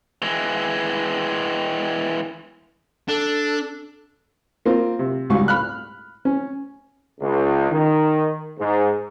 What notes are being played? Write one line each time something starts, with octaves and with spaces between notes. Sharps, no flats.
E3 G#3
D4 A4
A#3 C4 F4
C3
C#2 G#2 G3 F#4 F5 C#6
B5 F6 F#6
C#4
C#2
D#3
G#2